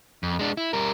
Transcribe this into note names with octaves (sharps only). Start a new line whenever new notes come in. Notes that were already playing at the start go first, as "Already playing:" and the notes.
F2
G#3 D4
E4
G3 A#4